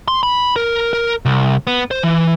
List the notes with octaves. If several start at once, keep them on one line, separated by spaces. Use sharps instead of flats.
C6
B5
A#4
A#4
C2
B3
C5
E3